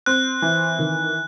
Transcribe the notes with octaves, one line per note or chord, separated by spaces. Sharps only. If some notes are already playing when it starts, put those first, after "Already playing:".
C4 F#6
E3
D#3